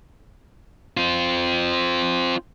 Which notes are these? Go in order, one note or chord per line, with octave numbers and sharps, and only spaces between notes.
C4 F4